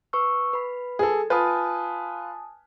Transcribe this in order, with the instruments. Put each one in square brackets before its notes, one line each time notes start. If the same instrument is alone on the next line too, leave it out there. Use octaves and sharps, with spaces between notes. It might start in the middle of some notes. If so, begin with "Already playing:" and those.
[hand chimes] B4 C#6 E6
B4 B5
[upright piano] G#4 A4
[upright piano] F4 B4 [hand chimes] G#5 A5 D#6